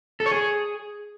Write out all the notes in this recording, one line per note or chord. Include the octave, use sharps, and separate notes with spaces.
A4
C#5
G#4